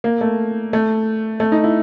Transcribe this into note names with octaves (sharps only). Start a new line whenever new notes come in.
A#3
A3
A3
A3
D#4
E4